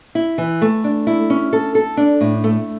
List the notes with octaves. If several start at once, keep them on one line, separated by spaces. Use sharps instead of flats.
E4
E3
A3
D4
E4
C#4
A4
A4
D4
A2
A3